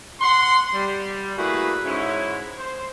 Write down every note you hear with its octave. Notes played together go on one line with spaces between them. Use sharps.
F#5 C6
G3
A3 A#3 E4 F#4 G#4 B4
G#2 C#4 E4
C5